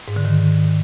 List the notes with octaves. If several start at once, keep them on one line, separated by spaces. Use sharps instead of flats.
G#2
D3
D#3